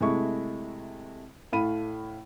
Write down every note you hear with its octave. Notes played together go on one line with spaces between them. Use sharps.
C3 G#3 A3 E4 C#6
A2 A3 F5 B5 D#7